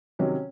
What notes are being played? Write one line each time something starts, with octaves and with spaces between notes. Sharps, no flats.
C3 D#3 F#3 C#4